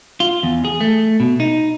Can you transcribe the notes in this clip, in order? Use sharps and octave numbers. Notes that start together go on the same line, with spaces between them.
F4
E2
G#4
A3
B2
D#4